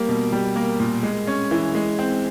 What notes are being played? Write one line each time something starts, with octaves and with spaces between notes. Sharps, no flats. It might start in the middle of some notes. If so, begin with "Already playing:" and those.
Already playing: G3 A#3
B2
G3
A#3
A#2
G#3
C#4
E3
G#3
C4